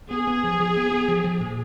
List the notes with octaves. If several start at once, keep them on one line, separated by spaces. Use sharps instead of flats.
B3 G#4
B3
F3
F3
B3
B3
F3
F3
A#2